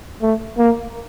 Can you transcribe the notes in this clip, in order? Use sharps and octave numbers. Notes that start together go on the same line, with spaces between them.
A3
A#3